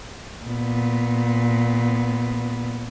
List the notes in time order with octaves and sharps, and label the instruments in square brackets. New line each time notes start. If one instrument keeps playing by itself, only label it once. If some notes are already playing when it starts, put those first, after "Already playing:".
[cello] A#2 B3